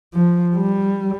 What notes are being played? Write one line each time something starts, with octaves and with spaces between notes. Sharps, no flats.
F3
G3